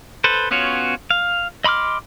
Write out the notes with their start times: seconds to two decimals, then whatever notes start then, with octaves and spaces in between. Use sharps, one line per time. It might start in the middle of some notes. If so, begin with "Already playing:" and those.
0.24 A4 B4 C5
0.51 B3 C#4 F4 F#4 C#5
1.11 F5
1.64 D#5 B5 C6 D6 F6